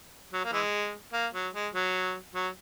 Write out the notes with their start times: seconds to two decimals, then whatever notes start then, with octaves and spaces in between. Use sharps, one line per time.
0.33 F#3
0.45 A#3
0.52 E3 G#3
1.13 A#3
1.34 F#3
1.53 G#3
1.74 F#3
2.34 F#3